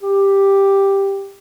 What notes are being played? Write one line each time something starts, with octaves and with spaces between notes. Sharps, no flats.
G4